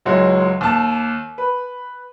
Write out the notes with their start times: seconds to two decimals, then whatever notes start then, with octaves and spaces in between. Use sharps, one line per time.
0.05 C#2 F#3 G#3 E4
0.61 D#2 A5
1.38 B4